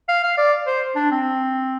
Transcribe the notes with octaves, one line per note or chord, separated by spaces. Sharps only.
F5
F5
D5
C5
D4
C4